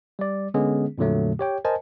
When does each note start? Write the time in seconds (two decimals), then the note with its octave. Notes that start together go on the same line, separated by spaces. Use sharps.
0.19 G3 D5
0.54 D3 G#3 B3 C#4 G#4
0.98 F2 A#2 D3 F#3 A3
1.39 G4 C#5 G5
1.65 A#4 C5 D#5 G#5 A5